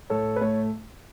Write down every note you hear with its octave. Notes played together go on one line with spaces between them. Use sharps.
A2 A4 C#5
B4
A3 A4 C#5